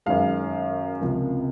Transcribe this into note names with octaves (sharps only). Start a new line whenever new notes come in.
F#2 D#3 G#3 F5
C#2 C3 F3 A#3